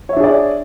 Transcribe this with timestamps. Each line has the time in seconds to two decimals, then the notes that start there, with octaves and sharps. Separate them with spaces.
0.09 C#5
0.13 E5
0.16 D4
0.20 G#4
0.24 D5